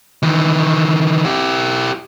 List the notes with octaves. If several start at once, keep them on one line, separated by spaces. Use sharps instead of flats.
D#3 E3
E4 G4